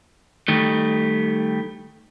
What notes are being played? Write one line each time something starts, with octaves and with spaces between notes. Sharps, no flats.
D#3 G3 A3